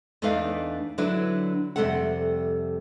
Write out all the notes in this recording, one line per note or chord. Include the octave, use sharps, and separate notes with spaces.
E2 A3 D4 D#4 B4 F5
D3 F#3 D4 E4 B4
F2 C3 G3 A3 A4 F#5